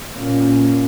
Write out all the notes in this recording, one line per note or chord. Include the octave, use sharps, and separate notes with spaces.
A#2 A#3 C#4